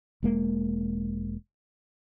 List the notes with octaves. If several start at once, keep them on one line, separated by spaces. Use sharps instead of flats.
E1 G#3 A#3